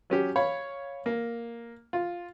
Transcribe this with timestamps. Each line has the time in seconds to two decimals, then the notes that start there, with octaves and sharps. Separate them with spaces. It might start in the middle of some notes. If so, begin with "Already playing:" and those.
0.10 F#3 C#4 G4
0.36 C#5 F5 B5
1.06 A#3
1.93 F4